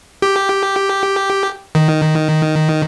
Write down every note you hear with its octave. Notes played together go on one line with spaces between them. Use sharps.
G4
D#3